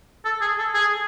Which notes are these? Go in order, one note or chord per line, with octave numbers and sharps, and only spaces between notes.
A4
G#4
A4
G#4